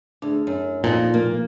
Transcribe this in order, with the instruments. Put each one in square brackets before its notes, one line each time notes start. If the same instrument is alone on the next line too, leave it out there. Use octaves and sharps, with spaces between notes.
[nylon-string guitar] D2 [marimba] D4 G#4
[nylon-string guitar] F#2
[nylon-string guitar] F2 [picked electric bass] A#2 [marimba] D#4 F5
[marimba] B2 F3 [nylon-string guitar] A#3